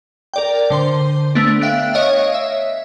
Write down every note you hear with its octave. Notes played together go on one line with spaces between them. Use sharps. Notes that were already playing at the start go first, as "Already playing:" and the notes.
A#4 D5 G5
D3 C5 C6
A3 B3 D4
E5 F5 G5 F#6 D7
C#5 D#5 F5
E5